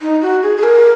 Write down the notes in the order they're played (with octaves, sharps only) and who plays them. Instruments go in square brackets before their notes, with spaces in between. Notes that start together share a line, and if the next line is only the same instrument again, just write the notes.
[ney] D#4
F#4
G#4
G#4
A#4